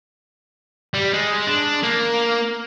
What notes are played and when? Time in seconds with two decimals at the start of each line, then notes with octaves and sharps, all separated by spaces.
0.94 G3
1.13 G#3
1.47 D4
1.83 A#3